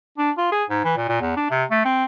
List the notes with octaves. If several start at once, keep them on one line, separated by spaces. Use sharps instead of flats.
D4
F4
G#4
G#2
E3
A#2
A#2
E2
D4
C3
A3
C4